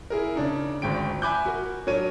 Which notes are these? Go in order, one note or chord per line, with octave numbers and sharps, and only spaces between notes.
E4 G#4 A#4
C#3 D4 D#4
G#1 D2 G5 D7
E5 G#5 B5 D6 F#6 G6
F#4 A#4
F#3 D4 A#4 C#5 D#7